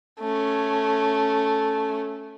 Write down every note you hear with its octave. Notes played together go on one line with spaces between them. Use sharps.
A3 C#4